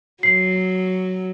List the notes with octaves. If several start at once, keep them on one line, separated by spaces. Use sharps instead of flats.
F#3 C7